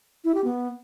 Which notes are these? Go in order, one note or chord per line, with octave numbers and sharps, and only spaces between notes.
E4
G4
B3